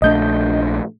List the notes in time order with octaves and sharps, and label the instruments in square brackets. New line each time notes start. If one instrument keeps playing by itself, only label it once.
[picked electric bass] A#1 A3 D4 [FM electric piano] D#5 G6